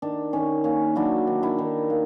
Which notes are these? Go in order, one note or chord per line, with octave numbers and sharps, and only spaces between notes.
D#3 D4
D#3 C#4
A#3 C#4
F#3 D4 E4
D#3
D4 E4
D#3
A#3